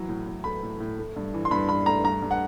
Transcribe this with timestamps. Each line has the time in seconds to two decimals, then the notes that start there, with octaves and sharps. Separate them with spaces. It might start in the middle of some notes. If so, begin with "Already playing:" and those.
Already playing: E3 F#3
0.08 A2
0.27 A2
0.44 A3 B5
0.63 A2
0.80 A2
0.98 A3
1.16 G2
1.34 E3
1.45 C6
1.51 G2 B5
1.69 G2 B5
1.86 A3 A#5
2.04 G2 A#5
2.22 G2
2.31 F#5